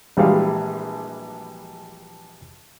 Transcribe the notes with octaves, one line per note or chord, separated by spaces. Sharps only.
A#1 E3 G3 G#3 F#4 F5